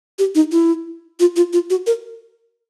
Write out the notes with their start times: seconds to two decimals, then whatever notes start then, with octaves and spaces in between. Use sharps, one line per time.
0.19 G4
0.35 D#4
0.52 E4
1.20 F4
1.36 F4
1.53 F4
1.70 F#4
1.87 A#4